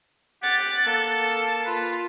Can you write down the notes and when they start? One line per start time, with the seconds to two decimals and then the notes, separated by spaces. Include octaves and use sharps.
0.43 G4 F#5 F#6 A6
0.86 A#3 A4
1.24 A5
1.66 F4 B4